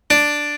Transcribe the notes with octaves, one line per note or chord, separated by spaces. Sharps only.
D4